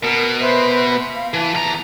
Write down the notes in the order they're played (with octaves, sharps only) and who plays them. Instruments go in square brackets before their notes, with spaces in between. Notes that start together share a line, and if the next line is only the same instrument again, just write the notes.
[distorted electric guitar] B2 [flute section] A#4
[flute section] B4 C5 E5
F5
[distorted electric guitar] E3 [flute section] A5
[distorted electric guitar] E2 A#5